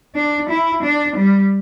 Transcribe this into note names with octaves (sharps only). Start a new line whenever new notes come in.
D4
E4
D4
G3